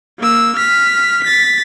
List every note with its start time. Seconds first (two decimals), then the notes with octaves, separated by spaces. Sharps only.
0.18 A#3 E6
0.55 F6 B6
1.23 A6 B6